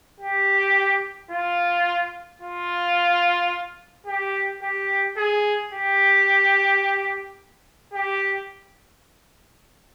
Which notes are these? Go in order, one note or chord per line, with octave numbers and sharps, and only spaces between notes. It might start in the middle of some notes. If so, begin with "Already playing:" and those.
G4
F4
F4
G4
G4
G#4
G4
G4